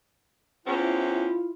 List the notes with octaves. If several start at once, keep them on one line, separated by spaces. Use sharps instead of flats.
E2 C4 C#4 E4 F4